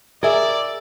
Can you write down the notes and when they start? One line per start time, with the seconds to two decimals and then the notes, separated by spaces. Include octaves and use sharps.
0.23 G#4 A#4 D5 E5